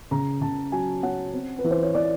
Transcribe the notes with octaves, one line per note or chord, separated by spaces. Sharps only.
C#3 A#5
C#3 A5
F#3 G#5
C#4 F#5
C4
B4
E3
C5
C#5
E3 D5